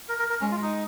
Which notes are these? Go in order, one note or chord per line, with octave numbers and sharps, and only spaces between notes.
A#4
A#4
A#4
G#3 C#4
F4
D#4